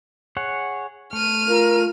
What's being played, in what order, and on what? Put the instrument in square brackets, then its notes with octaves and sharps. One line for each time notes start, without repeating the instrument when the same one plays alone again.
[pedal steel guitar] G#4 C#5 F#5
[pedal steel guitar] A3 [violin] F6 D#7
[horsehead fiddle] F4 [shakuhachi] A#4